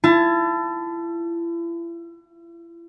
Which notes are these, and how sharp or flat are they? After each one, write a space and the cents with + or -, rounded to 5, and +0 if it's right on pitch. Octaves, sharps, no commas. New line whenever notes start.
E4 +40 A5 +0